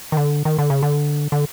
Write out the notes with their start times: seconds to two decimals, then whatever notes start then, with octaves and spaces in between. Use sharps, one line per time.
0.12 D#3
0.17 D3
0.45 D#3
0.59 D3
0.70 C#3
0.83 D3
1.32 D3